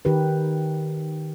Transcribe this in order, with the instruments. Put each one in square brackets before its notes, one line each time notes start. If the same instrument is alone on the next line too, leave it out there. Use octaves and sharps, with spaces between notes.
[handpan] D#3 G4 B4